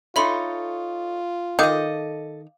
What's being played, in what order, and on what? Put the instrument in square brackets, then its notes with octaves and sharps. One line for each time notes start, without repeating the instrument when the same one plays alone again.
[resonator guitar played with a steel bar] D#4 A4 C#5 [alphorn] F4 [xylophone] E5 B5 C6
[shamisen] D#3 [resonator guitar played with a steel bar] A4 D#5 [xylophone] F5 D6 G6